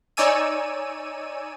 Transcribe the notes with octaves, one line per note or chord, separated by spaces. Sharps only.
D#4 C#5 D5 G#5 E6 D#7